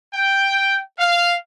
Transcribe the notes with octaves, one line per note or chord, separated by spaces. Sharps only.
G5
F5